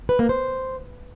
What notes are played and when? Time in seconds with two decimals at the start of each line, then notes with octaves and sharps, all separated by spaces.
0.09 B4
0.19 A#3
0.29 C5